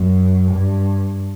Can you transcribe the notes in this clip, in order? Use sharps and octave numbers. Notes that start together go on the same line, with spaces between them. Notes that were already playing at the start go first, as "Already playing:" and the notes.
Already playing: F#2
G2